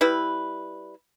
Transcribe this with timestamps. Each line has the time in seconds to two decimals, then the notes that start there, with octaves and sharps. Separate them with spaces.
0.01 G3 E4 B4